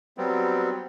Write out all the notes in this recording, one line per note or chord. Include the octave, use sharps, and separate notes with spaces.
F#3 G3 B3 C4